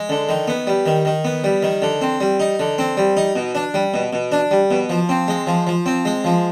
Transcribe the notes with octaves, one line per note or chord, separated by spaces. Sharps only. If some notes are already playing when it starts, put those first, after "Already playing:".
Already playing: G#3
D3
D#3
B3
G3
D#3
D#3
B3
G3
D#3
D3
C4
G3
D#4
D3
C4
G3
D#4
B2
D4
G3
B2
B2
D4
G3
B2
F3
C4
G#3
F3
F3
C4
G#3
F3